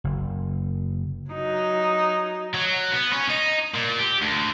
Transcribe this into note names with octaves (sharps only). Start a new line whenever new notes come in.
F#1
F#3 D#4
F#3
B3
C#4
D#4
A#2
G4
D2